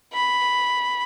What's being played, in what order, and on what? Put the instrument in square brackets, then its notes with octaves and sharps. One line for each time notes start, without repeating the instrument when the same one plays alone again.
[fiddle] B5